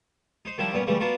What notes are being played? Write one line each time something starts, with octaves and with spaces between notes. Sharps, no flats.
D#4 C5
D#3 F3 G3 D4 E4
G2 A#2 B3 C#4
G2 C#3 E3 G3 A3
B3 D4 F4 F#4 A#4